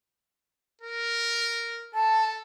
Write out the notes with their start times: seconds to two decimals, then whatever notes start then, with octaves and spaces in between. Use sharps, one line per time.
0.81 A#4
1.94 A4 A5